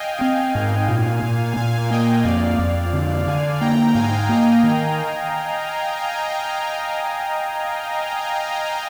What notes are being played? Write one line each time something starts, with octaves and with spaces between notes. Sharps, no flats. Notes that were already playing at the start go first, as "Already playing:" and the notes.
Already playing: D#5 F5 G5 G#5
C4 F5 G#5
G#2 F5 G#5
A#2
A#2
A#2 F5 G#5
A#3 D#5 G5
F2 D5 F5
F2
D3
D3 F5 G#5
A#3 G5 A#5
G#2 F5 G#5
A#3 D#5 G5
D#3